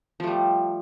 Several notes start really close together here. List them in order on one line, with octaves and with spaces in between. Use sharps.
F3 A3 G3